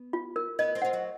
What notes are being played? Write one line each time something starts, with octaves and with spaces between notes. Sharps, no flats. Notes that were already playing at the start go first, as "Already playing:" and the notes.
Already playing: B3
F4
A#4
B3 B4 D#5
C4 C5
F4 F#5
F#3 F#4